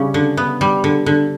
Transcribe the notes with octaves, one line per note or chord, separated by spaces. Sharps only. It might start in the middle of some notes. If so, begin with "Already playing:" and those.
Already playing: C#3 G3 C#4
D3
B3
G3
D3
D3